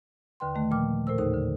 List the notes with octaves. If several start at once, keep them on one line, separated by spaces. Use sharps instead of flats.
D#2 D3 B4 G5 C6
D#3 A3
A#2 F3 A#3 G5 D6 F6
A2 A#4 C5 E6
D#2 C#3 D#4 A4 C5
D3